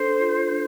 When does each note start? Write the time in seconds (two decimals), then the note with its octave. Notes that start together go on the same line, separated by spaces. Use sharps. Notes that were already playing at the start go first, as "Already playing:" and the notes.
Already playing: D4 A4 C5
0.20 F4
0.51 D4